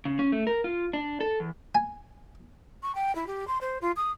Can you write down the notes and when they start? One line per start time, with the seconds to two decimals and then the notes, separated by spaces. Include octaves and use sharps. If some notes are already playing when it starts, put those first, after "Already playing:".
0.05 C#3
0.19 C#4
0.32 A3
0.47 A#4
0.64 F4
0.93 D4
1.21 A4
1.40 E2
1.75 G#5
2.82 C#6
2.95 G5
3.15 E4
3.27 G4
3.47 C6
3.61 C5
3.81 F4
3.96 D#6